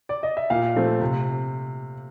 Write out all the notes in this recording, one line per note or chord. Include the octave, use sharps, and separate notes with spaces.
D5
D#5
E5
A#2 F5
F3 A3 C4
C3